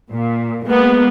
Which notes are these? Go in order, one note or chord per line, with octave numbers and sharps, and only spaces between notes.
A#2
G#3 A#3 B3